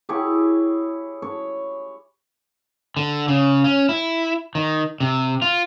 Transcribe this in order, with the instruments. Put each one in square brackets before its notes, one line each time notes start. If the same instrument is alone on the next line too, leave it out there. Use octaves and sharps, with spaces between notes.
[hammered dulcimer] E4 G4 G#4 C#5
C#5
[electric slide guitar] D3
C#3
C#4
E4
D#3
C3
F4